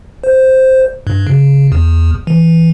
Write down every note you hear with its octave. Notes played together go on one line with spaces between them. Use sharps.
C5
G2
C#3
E2
E3